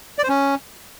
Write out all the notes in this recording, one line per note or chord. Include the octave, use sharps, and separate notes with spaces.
D5
C5
C#4